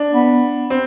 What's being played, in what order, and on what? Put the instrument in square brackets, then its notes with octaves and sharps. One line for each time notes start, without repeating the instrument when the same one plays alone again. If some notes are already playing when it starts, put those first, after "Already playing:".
Already playing: [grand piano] D4
[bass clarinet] B3
[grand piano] C4